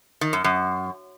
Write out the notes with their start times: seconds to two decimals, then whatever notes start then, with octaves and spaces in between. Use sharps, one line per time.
0.21 D#3
0.33 F#2
0.44 F#2